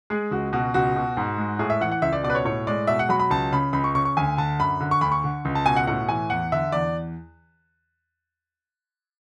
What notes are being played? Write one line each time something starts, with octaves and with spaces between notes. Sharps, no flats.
G#3 G#4
C#2 F#4
B2 F#4
C#2 F#4
B2
G#2
G#3
A2 G#4
E5
E3 F#5
F#5
C#2 E5
D5
B2 D5
B4
C#5
A2 C#5
G#3 D5
B2 E5
F#5
F#3 B5
B5
C#2 A5
C#3 B5
C#2 B5
C#6
C#3 C#6
C#6
D2 G#5
D3 A5
F#2 B5
D3
C#6
D2 B5
C#6
D3
C#2
A5
B2 G#5
F#5
A2 F#5
E3 G#5
E2 F#5
D3 E5
E2 D5